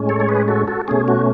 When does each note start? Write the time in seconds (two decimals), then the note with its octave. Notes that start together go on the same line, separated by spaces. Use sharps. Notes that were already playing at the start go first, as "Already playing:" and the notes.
Already playing: A2 G#3 C#4
0.09 A4 C#5
0.20 C#5
0.29 G#4 B4
0.48 F#4 A4
0.68 F#4 A4
0.88 B2 A3 C#4 G#4
1.08 F#4